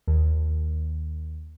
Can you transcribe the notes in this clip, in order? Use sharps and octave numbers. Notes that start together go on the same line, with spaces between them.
D#2